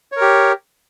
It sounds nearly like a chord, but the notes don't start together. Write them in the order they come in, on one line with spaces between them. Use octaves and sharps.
C#5 A#4 G4